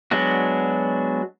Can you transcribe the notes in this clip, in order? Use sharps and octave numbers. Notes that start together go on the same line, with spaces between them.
F#3 G#3 B3 D4 F#4